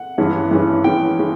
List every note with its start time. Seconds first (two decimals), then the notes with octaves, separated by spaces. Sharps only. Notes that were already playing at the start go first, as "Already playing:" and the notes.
Already playing: F#5
0.18 G2 E3 G#3 C#4
0.51 G2 E3 G#3 C#4
0.84 G2 E3 G#3 C#4 G5
1.19 E3 G#3 C#4